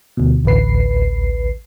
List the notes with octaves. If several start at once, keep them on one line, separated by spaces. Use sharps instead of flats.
D2 B2
A1 D2 B4 C7